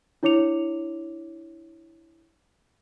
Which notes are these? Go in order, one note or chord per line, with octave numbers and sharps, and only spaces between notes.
D4 E4 C#5 D6 C#7 F7